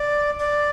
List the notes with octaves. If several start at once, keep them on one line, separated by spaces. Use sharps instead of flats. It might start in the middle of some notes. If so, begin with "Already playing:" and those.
Already playing: D5
D5